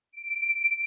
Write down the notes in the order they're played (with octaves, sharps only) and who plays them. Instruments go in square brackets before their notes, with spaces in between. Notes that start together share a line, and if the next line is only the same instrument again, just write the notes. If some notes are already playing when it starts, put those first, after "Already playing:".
[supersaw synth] D7